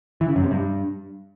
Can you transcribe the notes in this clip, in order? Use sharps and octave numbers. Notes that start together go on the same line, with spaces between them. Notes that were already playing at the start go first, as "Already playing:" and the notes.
E3
C#3
F#2
C3
G2